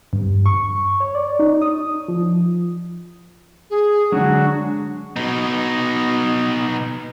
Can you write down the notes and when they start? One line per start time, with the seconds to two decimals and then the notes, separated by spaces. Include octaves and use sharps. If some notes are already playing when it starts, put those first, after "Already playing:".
0.13 G2
0.46 C#6
1.00 C#5
1.15 D5
1.39 D#4
1.62 D#6
2.08 F3
3.70 G#4
4.12 D3 F#3 G#3 D4 F#4
5.16 B2 D#4